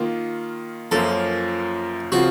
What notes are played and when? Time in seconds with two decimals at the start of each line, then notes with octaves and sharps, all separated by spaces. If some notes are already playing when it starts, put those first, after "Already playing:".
Already playing: D#3 A#3 F4
0.91 F#2 F3 A#3 C#4 F4 A4
2.12 C#3 F3 C4 F4 F#4